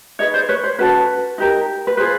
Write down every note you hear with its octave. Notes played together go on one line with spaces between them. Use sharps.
D#4 G#4 B4 C#5 D#5
C5 D5
B4 C#5
C5
C#4 F#4 A4 B4
D#4 G4 A#4
B4
F4 G#4 B4 C5